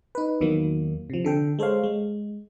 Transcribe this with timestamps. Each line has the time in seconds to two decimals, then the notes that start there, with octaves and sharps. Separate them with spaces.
0.15 D#4 B4
0.41 E2 D#3 F#3 A#3
1.10 C3 F3
1.25 D3 A4 G5
1.59 G#3 A4 C5 C#5 F5
1.83 G#3